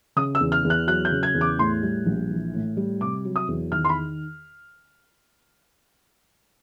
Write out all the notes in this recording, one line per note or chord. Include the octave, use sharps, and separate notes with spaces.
C#3 D#6
E6
E2
F6
E2
F#6
F#3 F#6
G6
C#3
G#6
E2
D6
A2 C6
G3
A#1
E3
A2
G3
C3 D6
F#3
D#6
E2
D#3 F6
C6
B5